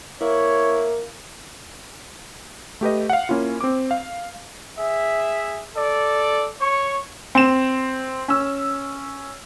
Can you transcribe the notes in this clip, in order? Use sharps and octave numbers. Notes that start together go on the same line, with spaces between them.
A#3 E4 C#5
A3 G4 B4 D#5
F5 F#5
A#3 C#4 E4 F4
C4 D6
F5
G#4 E5
A4 D5
C#5 C#6
C4 E7
C#4 E6